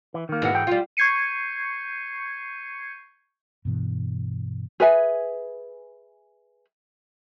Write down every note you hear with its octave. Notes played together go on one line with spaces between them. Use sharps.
E3
D#3 A#3
G#2 E3 F#4
G5
G3 F4
C#6 G6 G#6 C7 C#7 D#7
G2 B2 E3
G#4 B4 E5 G#5